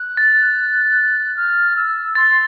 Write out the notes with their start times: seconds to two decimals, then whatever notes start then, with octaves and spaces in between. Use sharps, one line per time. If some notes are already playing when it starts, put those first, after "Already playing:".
Already playing: F#6
0.17 A6
1.37 F6
1.76 E6
2.15 C6 A6